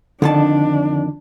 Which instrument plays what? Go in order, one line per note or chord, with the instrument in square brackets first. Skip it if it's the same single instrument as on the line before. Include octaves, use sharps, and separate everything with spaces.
[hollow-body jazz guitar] F2 D#3 A5 [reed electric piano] D3 [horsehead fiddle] D4